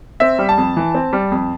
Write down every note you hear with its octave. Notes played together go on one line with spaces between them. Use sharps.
C4 E5
G3
A5
F2
E3
C4
G3
F2